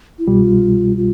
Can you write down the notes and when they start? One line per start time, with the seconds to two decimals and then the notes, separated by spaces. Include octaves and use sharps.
0.19 E4
0.27 C2 B2 G3 F4
0.97 F4